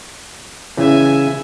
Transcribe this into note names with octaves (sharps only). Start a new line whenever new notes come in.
C#3 E3 E5 G#5